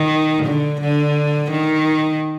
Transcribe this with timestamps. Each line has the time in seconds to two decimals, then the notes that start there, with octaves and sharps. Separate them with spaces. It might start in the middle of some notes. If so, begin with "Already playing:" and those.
Already playing: D#3
0.46 D3
0.81 D3
1.51 D#3